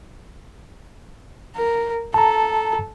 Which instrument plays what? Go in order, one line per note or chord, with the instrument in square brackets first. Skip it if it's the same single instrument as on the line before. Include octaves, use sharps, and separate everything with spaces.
[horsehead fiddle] A#4
[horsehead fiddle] A4 [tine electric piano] A5 A#5